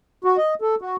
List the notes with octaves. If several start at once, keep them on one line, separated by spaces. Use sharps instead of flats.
F#4
D#5
A4
F#4